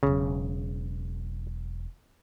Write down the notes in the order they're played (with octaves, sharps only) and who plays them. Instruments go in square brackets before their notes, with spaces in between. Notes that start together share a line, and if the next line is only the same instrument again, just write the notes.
[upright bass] E1 F#3 [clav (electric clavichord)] C#3